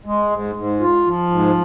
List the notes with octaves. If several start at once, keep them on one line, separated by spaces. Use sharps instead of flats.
G#3
G#2
G#2
F4
F3
G#2